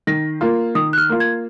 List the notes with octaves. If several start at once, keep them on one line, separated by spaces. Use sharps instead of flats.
D#3 A#6
A#3 F4
D#3 D#6
F#6
F6
A#3 F4
G#6